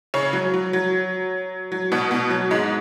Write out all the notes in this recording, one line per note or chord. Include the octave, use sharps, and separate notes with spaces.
C#3 C#4
F#3
F#3
F#3
F#3
B2 B3
B2 B3
F#3
G#2 G#3